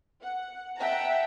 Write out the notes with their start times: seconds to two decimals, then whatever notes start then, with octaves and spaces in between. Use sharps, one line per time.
0.22 F#5
0.77 E5 F#5 G5 A5 A#5